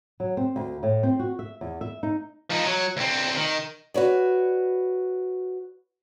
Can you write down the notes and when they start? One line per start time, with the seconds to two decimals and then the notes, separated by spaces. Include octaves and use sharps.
0.20 F#3
0.37 C4
0.56 D2
0.83 A2
1.03 C4
1.19 F#4
1.39 E5
1.61 E2
1.81 E5
2.03 D#4
2.50 F3 D#4
2.66 F#3
2.97 D2 C4
3.36 D#3
3.94 F#4 B4 C#5 D5